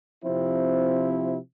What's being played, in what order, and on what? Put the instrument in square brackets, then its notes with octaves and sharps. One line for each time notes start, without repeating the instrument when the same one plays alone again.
[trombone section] C3 F3 C4 E4